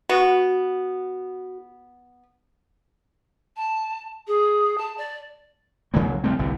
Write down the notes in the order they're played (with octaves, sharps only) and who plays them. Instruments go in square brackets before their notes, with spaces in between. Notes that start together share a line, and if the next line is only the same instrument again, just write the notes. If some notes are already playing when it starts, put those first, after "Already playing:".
[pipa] B3 [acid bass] F#4
[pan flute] A5
G#4
A5
D5
[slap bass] C2 C#3 F#3 A#3
D2 G3 A3 C4
G1 C2 C3 G3